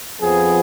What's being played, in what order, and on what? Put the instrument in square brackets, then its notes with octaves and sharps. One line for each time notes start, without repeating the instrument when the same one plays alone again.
[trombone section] F2 F3 B3 G#4